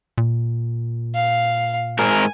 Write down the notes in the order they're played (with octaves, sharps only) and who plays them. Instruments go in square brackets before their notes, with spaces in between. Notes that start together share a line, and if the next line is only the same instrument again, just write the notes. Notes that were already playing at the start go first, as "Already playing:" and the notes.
[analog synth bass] A#2
[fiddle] F5
[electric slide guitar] G#2 A#4 [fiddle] G#5